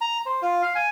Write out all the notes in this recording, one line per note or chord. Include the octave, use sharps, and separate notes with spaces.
A#5
C5
F4
F5
G#5